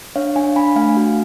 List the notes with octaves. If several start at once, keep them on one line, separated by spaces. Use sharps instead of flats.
D4 C#5 F5
D4 F5 G#5
D4 G#5 B5
A3 F5 G#5
F#4